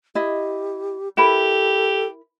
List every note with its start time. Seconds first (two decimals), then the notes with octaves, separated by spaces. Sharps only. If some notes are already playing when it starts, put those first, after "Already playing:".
0.15 E4 G4 D#5
1.17 E4 G4 A4 A#4 B5